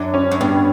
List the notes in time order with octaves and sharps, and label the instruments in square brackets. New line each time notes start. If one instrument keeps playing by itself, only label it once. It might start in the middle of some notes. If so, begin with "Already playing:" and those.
Already playing: [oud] F#2 [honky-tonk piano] D4
[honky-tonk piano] C#4
[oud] F#2
[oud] G2 [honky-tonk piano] B3